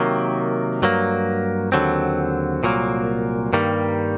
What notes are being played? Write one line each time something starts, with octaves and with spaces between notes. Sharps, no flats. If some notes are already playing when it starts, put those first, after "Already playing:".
Already playing: C3 D#3 F#3 A#3
G2 F#3 A#3
D#2 D3 F#3 C4
C2 A#2 F#3 A#3
G2 D#3 G3 A#3